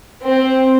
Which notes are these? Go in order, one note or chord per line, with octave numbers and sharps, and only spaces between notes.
C4